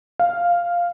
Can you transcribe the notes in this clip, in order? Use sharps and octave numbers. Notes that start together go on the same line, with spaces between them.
F5